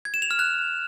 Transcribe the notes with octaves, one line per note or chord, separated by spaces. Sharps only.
G#6
E7
F7
F6
F#6